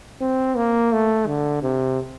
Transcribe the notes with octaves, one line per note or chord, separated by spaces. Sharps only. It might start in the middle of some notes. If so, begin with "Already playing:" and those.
C4
A#3
A3
D3
C3